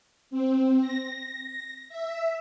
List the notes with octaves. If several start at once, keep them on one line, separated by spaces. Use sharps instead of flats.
C4
A#6
E5